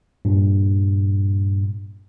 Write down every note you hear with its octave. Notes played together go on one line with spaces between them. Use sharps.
G2 A#2